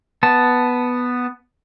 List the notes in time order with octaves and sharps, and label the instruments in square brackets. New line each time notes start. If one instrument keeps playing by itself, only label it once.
[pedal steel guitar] B3 A5